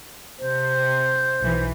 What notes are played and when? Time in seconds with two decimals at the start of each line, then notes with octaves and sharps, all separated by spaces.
0.39 C3 C5
1.41 B1 E3